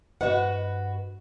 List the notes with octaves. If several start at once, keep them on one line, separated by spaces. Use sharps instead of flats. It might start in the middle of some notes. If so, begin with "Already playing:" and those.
G2 F#4 B4 C5 D#5 F#5